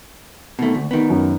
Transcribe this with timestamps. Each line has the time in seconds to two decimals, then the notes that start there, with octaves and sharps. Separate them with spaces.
0.59 B2 D#3 A3
0.75 D2
0.91 D#3 B3
1.10 F#2